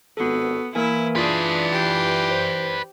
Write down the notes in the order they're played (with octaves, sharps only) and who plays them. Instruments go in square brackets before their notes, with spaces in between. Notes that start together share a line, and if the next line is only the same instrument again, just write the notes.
[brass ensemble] G#1 G2 [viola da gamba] B3 [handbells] F#4 A4
[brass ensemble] E3 [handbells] A#3 A#4 G#5 [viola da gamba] E4
[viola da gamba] D4 G#4 [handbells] F4 [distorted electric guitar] B4 D5
[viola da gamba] G4
[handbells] C5